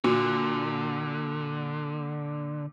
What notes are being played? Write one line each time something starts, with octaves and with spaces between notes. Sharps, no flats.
A#2 D3 F#4